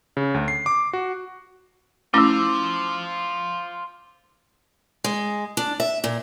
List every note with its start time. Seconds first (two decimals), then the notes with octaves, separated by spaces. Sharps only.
0.17 C#3
0.34 D2
0.48 C7
0.66 D6
0.93 F#4
2.14 A3 C#4 E4 F4 C5 D6 E6
5.04 G#3
5.57 D4
5.80 E5
6.04 A#2